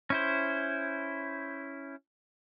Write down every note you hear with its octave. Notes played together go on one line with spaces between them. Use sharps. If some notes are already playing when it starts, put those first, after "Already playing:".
C#4 E4 C5